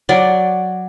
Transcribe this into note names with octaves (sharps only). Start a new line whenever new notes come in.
F#3 D5